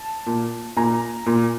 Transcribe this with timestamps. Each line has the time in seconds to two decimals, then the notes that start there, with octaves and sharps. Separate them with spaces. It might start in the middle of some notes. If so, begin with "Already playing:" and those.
Already playing: A5
0.26 A#2
0.77 A#2 G#5 A#5
1.26 A#2